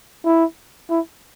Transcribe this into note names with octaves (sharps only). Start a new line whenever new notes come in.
E4
E4